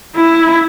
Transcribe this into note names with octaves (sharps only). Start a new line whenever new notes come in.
E4